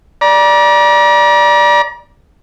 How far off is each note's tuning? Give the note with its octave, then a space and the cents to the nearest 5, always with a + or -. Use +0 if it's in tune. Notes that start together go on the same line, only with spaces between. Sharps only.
D5 +0 A#5 +40